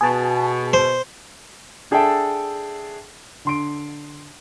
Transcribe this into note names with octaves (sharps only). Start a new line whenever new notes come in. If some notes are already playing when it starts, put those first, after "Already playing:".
B2 G#4 A5
C5
D4 G#4 A4 E5 G5 A5
D3 C6 D7